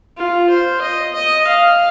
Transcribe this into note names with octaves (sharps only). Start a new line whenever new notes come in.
F4
C5
D#5
D#5
F5